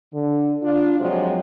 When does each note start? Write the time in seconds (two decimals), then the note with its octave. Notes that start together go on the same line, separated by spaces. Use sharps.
0.12 D3
0.62 D4 F4
0.99 F2 C3 F3 F#3 G#3 C4